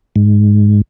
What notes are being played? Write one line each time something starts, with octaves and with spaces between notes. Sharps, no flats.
G#2